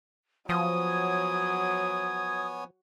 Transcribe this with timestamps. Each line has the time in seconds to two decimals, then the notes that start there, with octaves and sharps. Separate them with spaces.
0.49 F3 F#3 B3 C#5 G#5 D#6